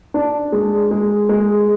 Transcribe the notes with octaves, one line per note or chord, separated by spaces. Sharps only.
D4
G#3
G#3
G#3